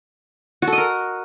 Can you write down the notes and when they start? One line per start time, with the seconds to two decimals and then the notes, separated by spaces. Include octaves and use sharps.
0.62 F#4
0.67 A4
0.72 D#5
0.78 A#4